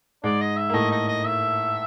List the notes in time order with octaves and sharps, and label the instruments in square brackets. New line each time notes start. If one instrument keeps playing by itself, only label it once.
[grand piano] G#2 G#3 [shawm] D5
[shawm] D#5
E5
[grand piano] A#3
[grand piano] A2 A3 [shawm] D#5
[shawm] D#5
D#5
E5